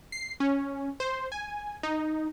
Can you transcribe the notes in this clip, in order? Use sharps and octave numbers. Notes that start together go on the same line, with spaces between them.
C7
C#4
C5
G#5
D#4